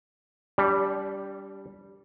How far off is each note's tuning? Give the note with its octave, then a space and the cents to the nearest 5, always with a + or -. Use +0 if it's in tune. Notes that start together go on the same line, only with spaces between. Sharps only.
G3 +0 D4 -35